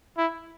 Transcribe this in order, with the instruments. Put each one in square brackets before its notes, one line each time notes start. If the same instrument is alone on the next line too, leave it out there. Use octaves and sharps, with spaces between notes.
[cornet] E4